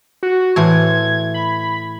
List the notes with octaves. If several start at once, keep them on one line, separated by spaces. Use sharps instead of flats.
F#4
A2 E3 C5 G#6
B5